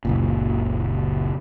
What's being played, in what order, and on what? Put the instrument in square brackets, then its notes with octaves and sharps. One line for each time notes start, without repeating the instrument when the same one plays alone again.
[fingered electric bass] F#1 C#2 A#2